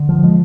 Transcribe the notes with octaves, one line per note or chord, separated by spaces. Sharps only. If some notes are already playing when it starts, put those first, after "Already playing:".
Already playing: D3
F3
G#3